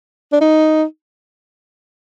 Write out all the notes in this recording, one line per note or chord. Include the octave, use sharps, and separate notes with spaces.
D4
D#4